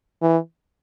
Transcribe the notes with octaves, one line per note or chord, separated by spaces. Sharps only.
E3